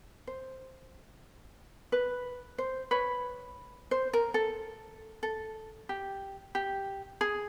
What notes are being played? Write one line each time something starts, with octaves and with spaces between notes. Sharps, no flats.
C5
B4
C5
B4 C#5
C5
A#4
A4
A4
G4
G4
G#4